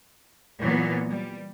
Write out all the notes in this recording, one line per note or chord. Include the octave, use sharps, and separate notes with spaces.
A#2 E3 F#3 A#3 B3
G3